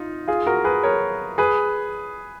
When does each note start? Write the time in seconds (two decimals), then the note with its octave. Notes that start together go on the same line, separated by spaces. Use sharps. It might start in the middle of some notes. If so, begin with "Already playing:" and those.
Already playing: D#4 F4
0.28 F4 G#4
0.47 F#4 A#4
0.64 G#4 B4
0.83 A#4 C#5
1.38 G#4 B4